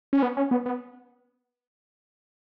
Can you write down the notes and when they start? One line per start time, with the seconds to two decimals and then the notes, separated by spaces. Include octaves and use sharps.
0.13 C#4
0.22 B3
0.37 C#4
0.51 B3
0.66 B3